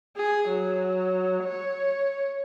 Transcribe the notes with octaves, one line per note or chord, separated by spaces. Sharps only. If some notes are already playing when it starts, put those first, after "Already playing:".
G#4
F#3
C#5